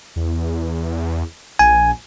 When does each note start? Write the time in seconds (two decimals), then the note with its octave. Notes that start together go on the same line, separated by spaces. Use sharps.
0.16 E2
1.59 A#1 G#5